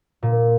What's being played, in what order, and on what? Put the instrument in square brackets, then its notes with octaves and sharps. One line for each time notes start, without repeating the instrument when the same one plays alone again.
[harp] A#2